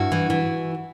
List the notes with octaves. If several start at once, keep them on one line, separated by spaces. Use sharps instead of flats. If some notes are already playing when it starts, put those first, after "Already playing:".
Already playing: G2 E4 F#4
E3
E3